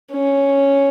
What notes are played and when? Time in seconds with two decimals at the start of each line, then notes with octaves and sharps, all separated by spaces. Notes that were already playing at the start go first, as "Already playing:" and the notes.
0.12 C#4